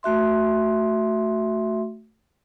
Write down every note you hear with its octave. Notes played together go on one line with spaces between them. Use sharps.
A3 F#4 E5 C6